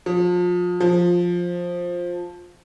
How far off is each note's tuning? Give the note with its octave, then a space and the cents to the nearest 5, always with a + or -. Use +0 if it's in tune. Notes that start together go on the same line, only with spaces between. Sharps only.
F3 +30
F3 +10